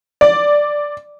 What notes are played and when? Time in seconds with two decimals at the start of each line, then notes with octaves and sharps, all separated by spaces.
0.21 D5